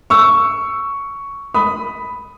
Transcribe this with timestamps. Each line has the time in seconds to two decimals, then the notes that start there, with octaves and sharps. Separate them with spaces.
0.10 C#6 E6
1.54 B5 D#6